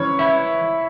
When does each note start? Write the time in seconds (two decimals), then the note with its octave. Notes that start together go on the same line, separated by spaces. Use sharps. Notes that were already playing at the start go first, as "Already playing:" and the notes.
Already playing: E3 C#4 C#5
0.19 E4 E5